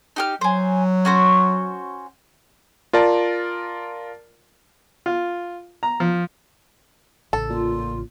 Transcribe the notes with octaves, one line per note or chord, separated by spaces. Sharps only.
D#4 G4 F6
F#3 C5 G#5
C#4 F#4 C5
F4 A#4 D5 A5
F4
A#5
F3
A1 C#3 A4
A#2 F4